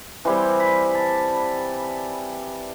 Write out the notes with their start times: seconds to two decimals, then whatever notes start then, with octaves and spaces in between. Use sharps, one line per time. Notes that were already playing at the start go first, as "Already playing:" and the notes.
0.25 E3 G3 C4 C6
0.60 B5
0.94 A5